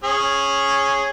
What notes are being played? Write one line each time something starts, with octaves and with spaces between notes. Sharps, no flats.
C#4 G#4